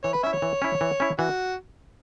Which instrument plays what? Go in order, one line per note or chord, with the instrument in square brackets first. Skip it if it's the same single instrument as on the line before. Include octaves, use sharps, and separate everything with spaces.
[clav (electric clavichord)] E3 [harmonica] C#5
[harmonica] B4
[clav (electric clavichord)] C#4 E4 [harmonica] E5
[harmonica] C#5
[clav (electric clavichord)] E3
C#4 E4
E3
C#4 E4
[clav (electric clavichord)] E3 [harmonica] F#4